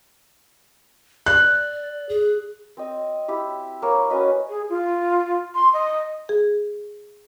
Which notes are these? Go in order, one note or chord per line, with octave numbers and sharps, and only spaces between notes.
D5 F#6
G#4
C4 D#5
E4 G4
A#3 C#5
C#4 F#4 B4 D#5
G#4
F4
C6
D#5
G#4